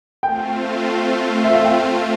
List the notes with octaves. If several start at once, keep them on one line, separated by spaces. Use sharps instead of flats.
A3 C4 F4 G5
E5
F5
G5